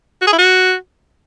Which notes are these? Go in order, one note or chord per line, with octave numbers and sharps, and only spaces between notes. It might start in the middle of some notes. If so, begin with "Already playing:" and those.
F#4
G#4
E4
F#4